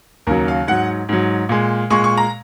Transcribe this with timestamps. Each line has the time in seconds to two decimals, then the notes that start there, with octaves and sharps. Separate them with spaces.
0.27 D#2 C#3 F#3 A#4
0.48 F5
0.67 G#2 F#3 F#5
1.09 G#2 F#3
1.49 A#2 G#3
1.90 A#2 G#3 C#6
2.04 C#6
2.17 A#5